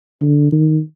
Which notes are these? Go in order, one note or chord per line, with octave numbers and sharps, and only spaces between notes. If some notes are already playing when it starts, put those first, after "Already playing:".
D3
D#3